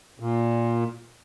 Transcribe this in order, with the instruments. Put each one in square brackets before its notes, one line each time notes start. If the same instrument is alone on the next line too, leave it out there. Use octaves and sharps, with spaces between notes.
[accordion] A#2